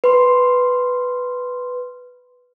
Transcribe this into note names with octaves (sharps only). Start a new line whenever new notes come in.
B4 C6